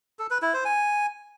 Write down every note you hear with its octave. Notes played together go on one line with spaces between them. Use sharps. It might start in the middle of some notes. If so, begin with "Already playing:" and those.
A4
B4
E4
C5
G#5